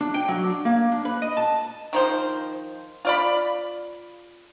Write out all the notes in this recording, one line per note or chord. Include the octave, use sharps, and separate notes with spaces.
D4
G5
F#3
D4
A#3
D4
B4
D#5
A5
D#3 F3 C5
F4 D5 B5